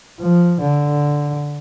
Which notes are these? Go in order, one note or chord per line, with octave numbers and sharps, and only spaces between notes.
F3
D3